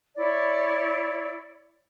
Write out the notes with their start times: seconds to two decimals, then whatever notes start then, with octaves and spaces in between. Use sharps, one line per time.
0.16 E4 C#5 D5